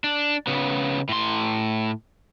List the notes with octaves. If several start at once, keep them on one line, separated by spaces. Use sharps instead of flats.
D4
C#3 B3
A2 C6